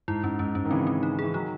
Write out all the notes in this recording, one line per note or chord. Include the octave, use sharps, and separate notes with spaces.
G#2 E4
G#2 C#4
G#2 C#4
G#2 C#4
D#3
C#3 E3 C4
C4
D#4
E3 G#4
D#3 F#3 D#4